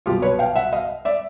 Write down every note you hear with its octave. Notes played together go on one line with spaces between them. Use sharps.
C2 B2 F#3 F4 G4
B4 C#5
F5 G5
E5 F#5
D#5 F5
D5 E5